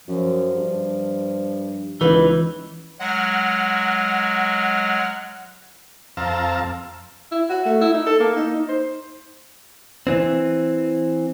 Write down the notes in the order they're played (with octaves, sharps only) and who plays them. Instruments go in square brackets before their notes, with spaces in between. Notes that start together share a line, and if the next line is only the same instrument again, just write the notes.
[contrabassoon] F#2 [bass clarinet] F3
[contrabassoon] G2
[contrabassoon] C#2 [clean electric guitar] E3 [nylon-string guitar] D#4 B4
[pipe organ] F#3 G#3 [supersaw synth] F#5 F6
[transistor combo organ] F2 C4 F5 A5 A#5 E6
[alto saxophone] E4
F#4
A3
E4
D#4
A4
A#3
D#4
D#4
C5
[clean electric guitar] E3 C4